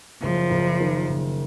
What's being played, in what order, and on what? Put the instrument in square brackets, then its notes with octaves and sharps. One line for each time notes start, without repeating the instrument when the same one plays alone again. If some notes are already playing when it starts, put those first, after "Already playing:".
[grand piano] F#1 [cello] F3
[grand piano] F#1
D#3
F#1